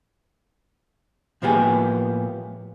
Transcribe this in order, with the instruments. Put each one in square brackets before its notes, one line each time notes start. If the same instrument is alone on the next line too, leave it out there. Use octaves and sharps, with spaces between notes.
[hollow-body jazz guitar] A2 F3 A#3 B3 G4 G#4